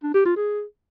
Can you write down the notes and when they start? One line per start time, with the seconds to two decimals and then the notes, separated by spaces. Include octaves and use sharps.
0.03 D4
0.14 G4
0.25 F4
0.36 G#4